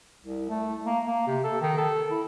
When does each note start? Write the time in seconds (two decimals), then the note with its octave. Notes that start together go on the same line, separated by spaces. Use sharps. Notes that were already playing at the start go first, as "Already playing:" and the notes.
0.25 C2
0.49 A3
0.86 A#3
1.07 A#3
1.27 C3
1.44 A4
1.61 D#3
1.78 A4
2.11 E4